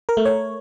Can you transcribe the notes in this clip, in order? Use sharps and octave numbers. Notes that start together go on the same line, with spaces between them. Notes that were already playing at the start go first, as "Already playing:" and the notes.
A#4
A3
C#5